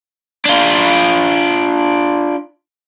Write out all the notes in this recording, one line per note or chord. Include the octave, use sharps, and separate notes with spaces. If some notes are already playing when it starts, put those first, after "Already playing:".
D4 F4